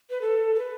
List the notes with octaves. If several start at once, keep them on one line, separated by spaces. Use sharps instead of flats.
B4
A4
A4
B4